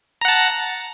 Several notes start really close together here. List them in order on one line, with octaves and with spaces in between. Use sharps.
A#5 F#5 A5